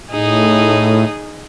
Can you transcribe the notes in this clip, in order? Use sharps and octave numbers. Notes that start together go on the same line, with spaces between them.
A2 D#4 G#4